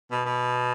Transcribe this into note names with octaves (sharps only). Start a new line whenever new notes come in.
B2
B2